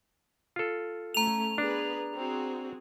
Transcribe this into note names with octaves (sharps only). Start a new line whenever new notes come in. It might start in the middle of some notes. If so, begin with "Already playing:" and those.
F4 A4
A3 C#4 A#5 F7
B3 D4 G#4 B4
C4 F#4 G#4